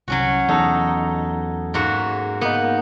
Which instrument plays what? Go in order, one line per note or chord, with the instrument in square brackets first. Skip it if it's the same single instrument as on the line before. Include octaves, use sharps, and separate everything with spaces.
[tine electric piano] C2 [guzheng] F#3 C#4 F#4
[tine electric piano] E2 A4 A#5 [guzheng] D#4
[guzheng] G#2 A#3 F#4
[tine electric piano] A#3 D#4 [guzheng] B3